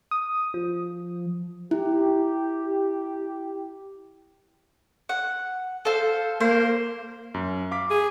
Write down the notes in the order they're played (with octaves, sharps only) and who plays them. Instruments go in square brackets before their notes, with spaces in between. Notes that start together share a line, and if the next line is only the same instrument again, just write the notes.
[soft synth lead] D#6
F3
[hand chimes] E4 [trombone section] G4
[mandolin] F#5
A4 C5 F5
[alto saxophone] A#3 [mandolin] C5
[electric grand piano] F#2
F5 D6 B6
[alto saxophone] G#4